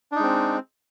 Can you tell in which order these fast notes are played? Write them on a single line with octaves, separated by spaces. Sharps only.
D4 D#4 G#3 C4